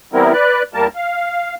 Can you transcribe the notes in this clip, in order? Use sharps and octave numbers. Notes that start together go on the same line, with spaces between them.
E3 G3 B3 C4 E4 A#4
B4 D5 F#6
E2 G3 A#3 A#4 A5
F5